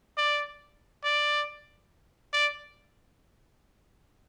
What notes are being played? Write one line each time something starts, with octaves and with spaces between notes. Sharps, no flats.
D5
D5
D5